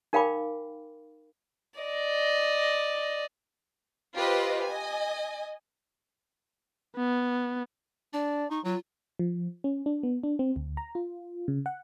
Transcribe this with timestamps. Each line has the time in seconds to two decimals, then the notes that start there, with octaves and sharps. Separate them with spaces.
0.13 D#4 A#4 F5 G5 B5 D6
1.80 D5 D#5
4.16 F4 G4 B4 C5 D#5
4.64 D#5 G#5
6.96 B3
8.13 D4 D5
8.51 D#4 C#6
8.65 F#3 F4
9.19 F3
9.64 C#4
9.86 D4
10.03 B3
10.23 D4
10.39 C4
10.56 D2
10.77 A#5
10.95 F4
11.48 C#3
11.66 F#5